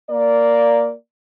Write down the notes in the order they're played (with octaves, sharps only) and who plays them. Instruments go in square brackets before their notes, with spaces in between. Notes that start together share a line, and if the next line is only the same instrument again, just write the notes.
[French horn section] A#3 D5